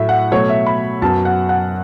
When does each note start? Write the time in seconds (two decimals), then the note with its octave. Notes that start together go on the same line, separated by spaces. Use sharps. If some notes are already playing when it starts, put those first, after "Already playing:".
Already playing: A2 F#3 A3 E5
0.09 F#5
0.32 B2 F#3 A3 C#5
0.49 E5
0.66 B5
1.02 F#2 F#3 B3 A5
1.25 F#5
1.49 F#5